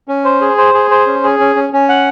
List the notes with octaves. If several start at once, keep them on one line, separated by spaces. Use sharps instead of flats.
C#4
C5
G#4
C5
G#4
C5
C#4
G#4
C#4
C#4
C#4
F#5